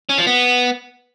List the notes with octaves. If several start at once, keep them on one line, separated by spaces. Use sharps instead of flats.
C#4
F3
B3